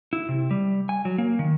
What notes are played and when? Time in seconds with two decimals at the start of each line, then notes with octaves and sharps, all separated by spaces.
0.13 E4
0.29 C3
0.51 G3
0.89 G#5
1.05 F#3
1.18 A#3
1.39 D#3